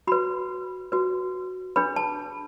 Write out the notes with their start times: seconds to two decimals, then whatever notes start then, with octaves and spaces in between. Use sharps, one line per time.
0.07 F#4 B4 B5
0.92 F#4 B4
1.76 D4 G#4 B4 B5
1.96 A5